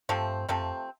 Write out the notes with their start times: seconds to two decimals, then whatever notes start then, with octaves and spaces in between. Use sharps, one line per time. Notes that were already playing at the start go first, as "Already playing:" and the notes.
0.09 G2 C3 F3 A3 C4
0.49 F#2 C3 F3 A3 C4
0.62 F2